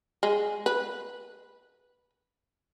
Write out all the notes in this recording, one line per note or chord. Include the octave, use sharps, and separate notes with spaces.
G#3
B4